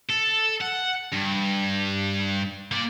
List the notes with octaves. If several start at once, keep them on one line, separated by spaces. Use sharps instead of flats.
A4
F#5
G2
A#3 D5